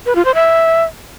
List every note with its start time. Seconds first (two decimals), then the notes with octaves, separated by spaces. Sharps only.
0.06 B4
0.16 F4
0.25 C5
0.35 E5